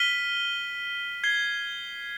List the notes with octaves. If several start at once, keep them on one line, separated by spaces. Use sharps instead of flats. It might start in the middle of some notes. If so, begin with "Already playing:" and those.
Already playing: F6 B6 D#7 G7
G#6 C7 G7